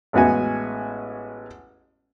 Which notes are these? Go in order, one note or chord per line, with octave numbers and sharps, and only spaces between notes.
A1 G#3 B3 F#4 G#5